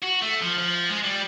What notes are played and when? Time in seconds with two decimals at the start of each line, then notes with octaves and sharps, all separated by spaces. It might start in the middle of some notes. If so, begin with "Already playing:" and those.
0.02 F#4
0.21 A3
0.42 F3
0.58 F3
0.90 G#3
1.04 G3